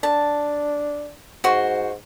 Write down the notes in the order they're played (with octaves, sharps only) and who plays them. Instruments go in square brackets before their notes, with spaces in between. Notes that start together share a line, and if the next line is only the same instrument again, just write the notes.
[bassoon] D4 [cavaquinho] A5
[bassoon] G#2 [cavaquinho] F#4 C5